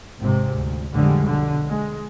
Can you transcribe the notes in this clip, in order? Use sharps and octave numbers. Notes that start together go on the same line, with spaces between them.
G#1 G#2 C3
D2
A1 F2 D3 G3 G#3
B1 D3
G#3